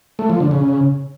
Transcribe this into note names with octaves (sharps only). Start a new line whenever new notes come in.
A3
F3
D3
C#3